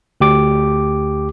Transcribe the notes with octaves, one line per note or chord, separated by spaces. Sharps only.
D2 G4 D6